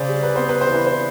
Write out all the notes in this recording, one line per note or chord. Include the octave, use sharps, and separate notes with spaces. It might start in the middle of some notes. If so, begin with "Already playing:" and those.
Already playing: C#3 C5 D5
G3
B4
B3 C5
B4
C5
E3
B4
C5